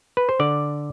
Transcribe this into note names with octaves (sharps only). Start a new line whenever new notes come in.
B4
C5
D3 D5